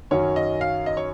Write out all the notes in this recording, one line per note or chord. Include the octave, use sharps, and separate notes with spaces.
F#2 D#3 F#3 C#4 C#5
D#5
F5
D#5
C#5